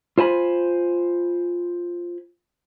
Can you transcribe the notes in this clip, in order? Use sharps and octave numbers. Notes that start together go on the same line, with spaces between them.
F4 C5 G#5 B5